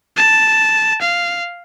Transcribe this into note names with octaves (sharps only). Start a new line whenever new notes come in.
A5
F5